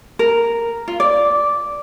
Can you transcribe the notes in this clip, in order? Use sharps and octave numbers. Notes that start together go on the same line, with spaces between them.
A#4
F4
D5